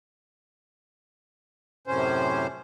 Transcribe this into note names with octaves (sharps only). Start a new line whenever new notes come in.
F#2 A2 C3 C#4 C5